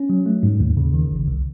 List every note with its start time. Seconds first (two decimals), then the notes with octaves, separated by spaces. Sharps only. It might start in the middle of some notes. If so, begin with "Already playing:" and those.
Already playing: C#4
0.10 F#3
0.26 A3
0.43 G#2
0.60 D#2
0.77 C#3
0.94 D#3
1.11 G#1
1.27 C2